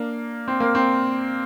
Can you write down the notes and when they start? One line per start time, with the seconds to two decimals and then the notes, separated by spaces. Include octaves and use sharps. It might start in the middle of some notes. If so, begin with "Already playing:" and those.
Already playing: A#3 D4
0.48 C4
0.60 A#3
0.75 C4